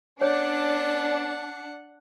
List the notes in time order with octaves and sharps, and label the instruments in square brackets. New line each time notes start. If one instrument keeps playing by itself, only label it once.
[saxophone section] B3 C#4 D5 [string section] D4 [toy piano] C#5 [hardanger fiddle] F#5